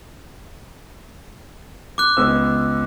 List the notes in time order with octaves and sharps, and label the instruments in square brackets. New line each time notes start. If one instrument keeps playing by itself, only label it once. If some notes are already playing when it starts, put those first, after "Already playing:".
[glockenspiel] D6 F#6
[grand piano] C#2 B3 E6